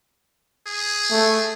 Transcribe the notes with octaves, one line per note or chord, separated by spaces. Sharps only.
G#4
A3